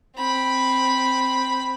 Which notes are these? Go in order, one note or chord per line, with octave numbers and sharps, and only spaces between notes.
C4 B5